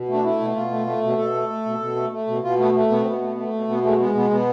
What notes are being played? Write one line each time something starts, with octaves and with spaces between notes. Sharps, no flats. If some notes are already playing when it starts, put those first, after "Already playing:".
Already playing: B2
A3
D4
A3 E4
B2
B2 F4
A3
A3
B2
B2 A4
A3
A3
B2
B2
A3
A3
B2
B2 F4
A3 B3
A3
B2 B3
C4
B2 B3
A3
A3
B2
B2 B3
G#3 A3
G#3 B3
B2 B3
B2 B3